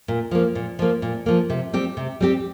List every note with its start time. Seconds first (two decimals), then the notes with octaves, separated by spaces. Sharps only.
0.08 A#2
0.31 F3 A#3
0.55 A#2
0.79 F3 A#3
1.02 A#2
1.26 F3 A#3
1.50 C3
1.73 G3 C4 G4
1.97 C3
2.20 G3 C4 G4